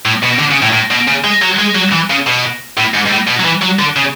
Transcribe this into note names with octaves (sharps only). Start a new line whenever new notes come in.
A2
B2
D3
C#3
A2
A2
B2
C#3
G#3
F#3
G#3
F#3
E3
C#3
B2
A2
G#2
G#2
A2
B2
F#3
E3
F#3
D3
C#3